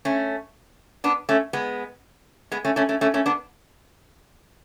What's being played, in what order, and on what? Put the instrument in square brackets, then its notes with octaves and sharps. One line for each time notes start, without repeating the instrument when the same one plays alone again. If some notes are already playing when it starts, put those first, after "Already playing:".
[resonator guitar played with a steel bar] A3 C#4
B3 D4
A3 C#4
G#3 B3
G#3 B3
A3 C#4
A3 C#4
A3 C#4
A3 C#4
A3 C#4
B3 D4